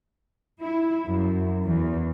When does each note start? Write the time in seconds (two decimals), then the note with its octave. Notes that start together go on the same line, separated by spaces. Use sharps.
0.62 E4
1.08 F#2
1.65 E2